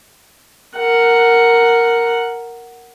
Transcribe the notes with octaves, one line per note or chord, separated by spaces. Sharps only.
A#4 F#5